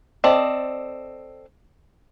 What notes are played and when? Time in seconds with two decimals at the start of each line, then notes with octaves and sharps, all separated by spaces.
0.24 C4 A4 D5 D#5